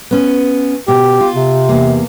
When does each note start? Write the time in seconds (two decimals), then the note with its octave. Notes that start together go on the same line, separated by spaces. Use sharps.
0.11 B3 C#4
0.88 B2 G4
1.21 F4
1.35 C3
1.69 E2 A#3